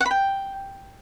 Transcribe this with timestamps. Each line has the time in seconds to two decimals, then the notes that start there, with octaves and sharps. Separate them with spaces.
0.01 F#5
0.06 B5
0.11 G5